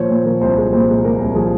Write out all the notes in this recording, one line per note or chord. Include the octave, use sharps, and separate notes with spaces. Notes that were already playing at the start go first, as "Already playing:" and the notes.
Already playing: A#2 F3 C5 C#5
A#2 C5
F3 A#4
C2 C5
G#3
A#2 C5
G#3
A#2 A#4
C2
F3 G#4